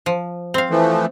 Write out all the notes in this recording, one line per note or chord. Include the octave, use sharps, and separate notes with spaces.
F3
C4 F5
E3 F3 A3